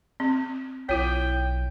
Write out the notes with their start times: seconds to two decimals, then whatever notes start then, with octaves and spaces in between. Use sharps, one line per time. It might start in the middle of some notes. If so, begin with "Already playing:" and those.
0.20 C4
0.89 B1 E4 F4 C#5 G5